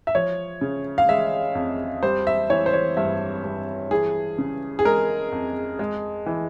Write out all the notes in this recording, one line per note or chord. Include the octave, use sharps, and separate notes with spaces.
E5
F3 C#5
C#3
F5
G#3 E5
F2
G3 C5
E5
E3 C#5
C5
C#5
G2 E5
G2
E3 G#4
C#3
G#4
G#3 A#4
F2
G#3
E3